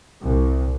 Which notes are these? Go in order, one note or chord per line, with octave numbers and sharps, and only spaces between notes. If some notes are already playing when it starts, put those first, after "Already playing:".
C2